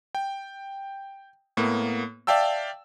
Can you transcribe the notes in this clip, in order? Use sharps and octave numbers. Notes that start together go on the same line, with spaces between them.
G5
A2 A#3 B3
D5 E5 F5 G5 A5 E6